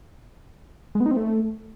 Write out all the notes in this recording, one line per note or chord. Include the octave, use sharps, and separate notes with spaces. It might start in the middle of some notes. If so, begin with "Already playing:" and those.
G#3
B3
D#4
C4
A3